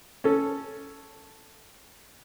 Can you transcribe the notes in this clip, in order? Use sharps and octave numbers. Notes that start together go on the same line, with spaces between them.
C#4 A4